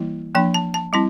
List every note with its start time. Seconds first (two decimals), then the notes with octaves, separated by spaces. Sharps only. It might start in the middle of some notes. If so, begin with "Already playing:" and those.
Already playing: E3 G3 A#3 E4
0.35 F3 A#3 D4 G5
0.54 A5
0.74 A5
0.93 G3 C4 E4 A5